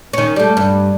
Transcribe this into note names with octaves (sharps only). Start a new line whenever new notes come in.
D#3 C#4
G3 A3
G2